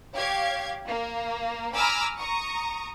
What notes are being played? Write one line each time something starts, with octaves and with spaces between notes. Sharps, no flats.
G4 C#5 F5 G#6
A#3
G#5 A#5 B5 D6 E6 F6
A#5 C#6 D#6